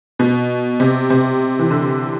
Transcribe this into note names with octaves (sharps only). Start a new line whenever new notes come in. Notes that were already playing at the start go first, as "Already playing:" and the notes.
B2
C3
C3
E3
D3